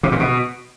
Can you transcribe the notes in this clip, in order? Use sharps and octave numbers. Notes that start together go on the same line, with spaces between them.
C3
A#2
B2